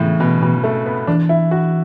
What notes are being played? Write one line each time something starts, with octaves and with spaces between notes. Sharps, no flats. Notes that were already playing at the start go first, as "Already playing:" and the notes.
Already playing: A2 C#3 E3
B2
B2
A3
B3
E3 D4
E4
F#4